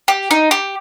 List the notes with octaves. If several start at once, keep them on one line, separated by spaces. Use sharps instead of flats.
G4
D#4
G4